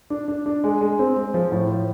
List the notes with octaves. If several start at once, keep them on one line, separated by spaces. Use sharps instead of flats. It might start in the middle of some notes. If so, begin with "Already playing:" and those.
D4
D4
D4
G#3
G#3
C4
G#3
F3
A2
F3